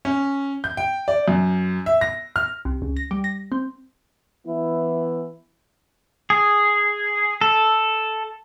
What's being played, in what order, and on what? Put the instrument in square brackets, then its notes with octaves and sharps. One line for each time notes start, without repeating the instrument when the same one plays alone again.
[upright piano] C#4
G6
G5
D5
F#2
E5
A#6
F6
[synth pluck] C2
C#2
A#6
G3
A#6
C4
[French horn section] E3 B3 E4
[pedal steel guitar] G#4
A4